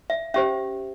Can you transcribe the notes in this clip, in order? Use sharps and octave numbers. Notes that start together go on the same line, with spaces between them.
E5
C#4 G4 C5 E5